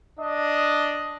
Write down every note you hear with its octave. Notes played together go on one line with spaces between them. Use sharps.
D4 D#5